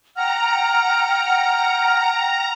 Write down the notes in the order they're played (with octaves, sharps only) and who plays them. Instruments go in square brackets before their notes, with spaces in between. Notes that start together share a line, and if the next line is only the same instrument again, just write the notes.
[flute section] F#5 G5 F6 [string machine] A#5